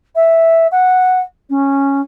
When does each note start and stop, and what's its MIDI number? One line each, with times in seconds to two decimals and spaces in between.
0.15 0.67 76
0.72 1.20 78
1.50 2.01 61